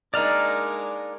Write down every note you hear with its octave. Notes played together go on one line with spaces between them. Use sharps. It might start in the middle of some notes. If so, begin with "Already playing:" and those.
G#3 A#3 D4 D#4 A#4 D5 F6